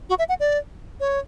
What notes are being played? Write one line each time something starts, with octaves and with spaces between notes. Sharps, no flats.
F#4
E5
F#5
D5
C#5